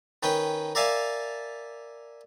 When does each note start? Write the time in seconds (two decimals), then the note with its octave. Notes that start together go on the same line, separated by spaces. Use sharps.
0.23 D#3 C#4 B4 G5
0.75 A#4 D5 E5 F5 G#5 A5